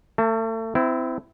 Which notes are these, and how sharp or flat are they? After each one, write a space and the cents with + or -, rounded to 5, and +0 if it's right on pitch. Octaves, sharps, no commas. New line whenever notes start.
A3 +35 A5 +0
C4 -30 E4 +0